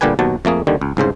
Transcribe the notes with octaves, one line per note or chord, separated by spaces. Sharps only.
A#2 D3 G3 G4 B4 G#5
D#2 B2 F#3 A5
F2 A3 A#3 G#4
D#2 D3 D#3 G3
C#2
C2 G#2 C#3 C5